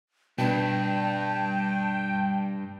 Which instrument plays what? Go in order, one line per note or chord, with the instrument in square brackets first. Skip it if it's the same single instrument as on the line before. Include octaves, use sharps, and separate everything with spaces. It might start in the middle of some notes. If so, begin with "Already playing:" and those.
[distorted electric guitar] G2 [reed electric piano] B2 D4 B4 [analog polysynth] G5 [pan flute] A5